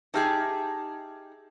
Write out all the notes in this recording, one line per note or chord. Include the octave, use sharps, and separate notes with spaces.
D#4 G4 G#4 E5 A5 F6